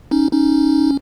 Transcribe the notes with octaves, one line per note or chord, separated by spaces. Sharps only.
C#4 D#4
C#4 D#4